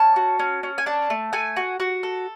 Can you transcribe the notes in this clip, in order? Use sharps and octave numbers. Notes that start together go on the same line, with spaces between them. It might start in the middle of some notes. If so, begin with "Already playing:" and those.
Already playing: C#4 A5
F#4
C#4
C#4
G#5
D4 A5
A3
A3 G#5
F#4
F#4
A4